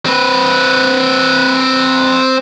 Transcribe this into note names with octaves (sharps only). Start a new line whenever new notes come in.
C4 B4